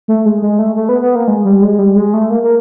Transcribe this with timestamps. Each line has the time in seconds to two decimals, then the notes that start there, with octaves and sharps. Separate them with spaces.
0.08 A3
0.26 G#3
0.42 G#3
0.59 A3
0.76 A3
0.89 B3
1.02 B3
1.15 A#3
1.28 G#3
1.45 G3
1.62 G#3
1.79 G3
1.95 G#3
2.14 A3
2.30 A#3
2.43 A#3